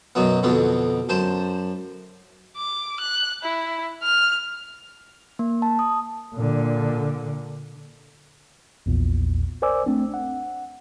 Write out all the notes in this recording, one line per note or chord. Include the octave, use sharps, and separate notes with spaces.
F#2 B2 F#3 B3
F2 B2 D3 B3
F#2 C5 A5
D6
F#6
E4
F6
A#3
A5
D#6
A#2 D3
A#1 E2 A#2
A#4 C5 D5 G#5 D6 E6
A3 C4 D4
F#5